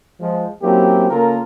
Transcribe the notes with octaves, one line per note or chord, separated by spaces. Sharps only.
F3 G#3
F#3 A#3 C4 C#4 E4 G4
C#3 A#3 F4 A4 A#4